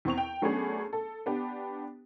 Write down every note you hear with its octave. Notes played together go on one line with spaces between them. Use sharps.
E2 C4 C#6 F7
G5
F#3 A3 B3 C#4 D4 G#4
A4
B3 D4 G4